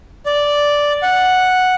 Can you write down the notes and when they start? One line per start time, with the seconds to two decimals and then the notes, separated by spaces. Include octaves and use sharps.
0.26 D5
1.03 F#5